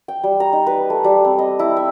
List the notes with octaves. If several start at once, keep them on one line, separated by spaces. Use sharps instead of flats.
G5
G3
A#5
D#4
B4
A3
G3
C4
D#5
E4
E5